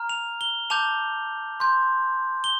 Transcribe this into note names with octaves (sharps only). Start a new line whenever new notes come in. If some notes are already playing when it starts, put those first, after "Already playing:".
Already playing: A#5 F6
F7
G7
A5 D6 G6 F7
C6 G6
G7